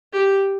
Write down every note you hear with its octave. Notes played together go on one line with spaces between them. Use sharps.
G4